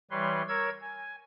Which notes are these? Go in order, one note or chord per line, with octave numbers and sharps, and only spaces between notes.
E3 G3 B4 C#5 C6
A#4 C#5 E6 G#6
G#5